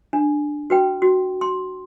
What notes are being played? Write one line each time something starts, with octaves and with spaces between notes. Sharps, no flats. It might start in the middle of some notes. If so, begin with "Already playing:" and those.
D4
F#4 B4 G5
F#4
C6